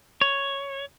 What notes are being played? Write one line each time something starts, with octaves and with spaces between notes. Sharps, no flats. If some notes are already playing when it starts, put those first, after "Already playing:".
C#5